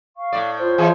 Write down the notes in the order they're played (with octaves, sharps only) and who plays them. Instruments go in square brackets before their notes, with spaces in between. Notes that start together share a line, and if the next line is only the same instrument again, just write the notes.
[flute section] F5 C#6
[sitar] A2 D5
[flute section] F4 C5 C#5
[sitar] F2 E3 G#4